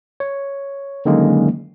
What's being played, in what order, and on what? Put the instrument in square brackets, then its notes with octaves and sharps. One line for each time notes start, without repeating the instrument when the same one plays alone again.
[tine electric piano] C#5
D3 D#3 F#3 G#3 A#3 C#4